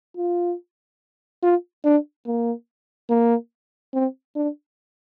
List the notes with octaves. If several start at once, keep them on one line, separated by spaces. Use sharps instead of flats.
F4
F4
D4
A#3
A#3
C4
D4